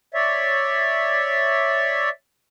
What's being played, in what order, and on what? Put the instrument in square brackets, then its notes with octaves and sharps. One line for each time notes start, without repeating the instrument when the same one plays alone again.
[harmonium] C#5 D5 E5